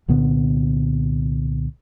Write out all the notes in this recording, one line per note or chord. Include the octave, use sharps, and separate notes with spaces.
C2 A#2 D3 B3